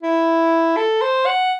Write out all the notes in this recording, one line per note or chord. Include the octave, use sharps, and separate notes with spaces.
E4
A4
C5
F#5